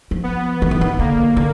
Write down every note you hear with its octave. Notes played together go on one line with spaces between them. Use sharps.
F3
B3
D#3
E3
D#3
D3 A#3
D3